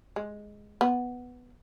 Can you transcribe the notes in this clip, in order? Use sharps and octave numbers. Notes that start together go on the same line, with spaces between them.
G#3
B3